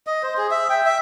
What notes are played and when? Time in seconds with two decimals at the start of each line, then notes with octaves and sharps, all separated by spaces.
0.07 D#5
0.23 C5
0.38 G#4
0.51 E5
0.70 G5
0.86 E5